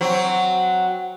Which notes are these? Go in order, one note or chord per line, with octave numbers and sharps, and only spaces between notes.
F#3 C4